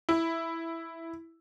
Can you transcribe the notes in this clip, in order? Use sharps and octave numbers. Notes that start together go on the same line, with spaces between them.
E4